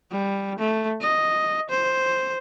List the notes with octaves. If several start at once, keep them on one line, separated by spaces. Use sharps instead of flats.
G3
A3
D#5
C5